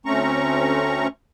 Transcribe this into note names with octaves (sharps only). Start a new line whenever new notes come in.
D2 A3 C4 C#4 A#5 C#6